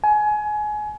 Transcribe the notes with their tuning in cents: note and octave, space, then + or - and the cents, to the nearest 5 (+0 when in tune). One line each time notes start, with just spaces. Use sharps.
G#5 +25